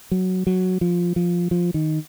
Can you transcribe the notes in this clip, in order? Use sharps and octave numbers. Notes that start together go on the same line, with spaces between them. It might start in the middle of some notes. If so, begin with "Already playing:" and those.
F#3
F#3
F3
F3
F3
D#3